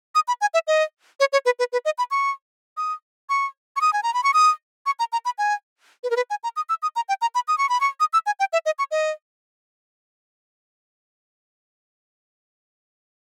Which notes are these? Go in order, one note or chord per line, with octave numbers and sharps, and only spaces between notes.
D#6
B5
G#5
E5
D#5
C#5
C#5
B4
B4
B4
D#5
B5
C#6
D#6
C#6
C#6
D#6
G#5
A#5
B5
C#6
D#6
C#6
A#5
A#5
B5
G#5
B4
A#4
B4
G#5
A#5
D#6
E6
D#6
A#5
G5
A#5
B5
D#6
C#6
B5
C#6
D#6
E6
G#5
G5
E5
D#5
C#6
D#5